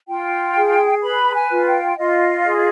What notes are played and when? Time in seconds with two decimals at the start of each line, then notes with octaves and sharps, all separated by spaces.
0.08 F4 G5
0.56 G#4
1.03 B4 B5
1.34 G#5
1.51 F4
1.67 G5
1.97 F4 D#5
2.45 G#4